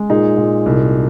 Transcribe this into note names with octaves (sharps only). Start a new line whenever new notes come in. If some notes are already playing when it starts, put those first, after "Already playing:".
Already playing: G#3
A#2 D#4 G#4
A#2
C2